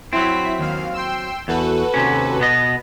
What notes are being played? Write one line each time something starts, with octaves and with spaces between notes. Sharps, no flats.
F#3 C4 E4 B6
D#2 F5
G5 C6 E6
E2 F#4 A4 B4
D#2 C3 C#4
B2 B3 D#5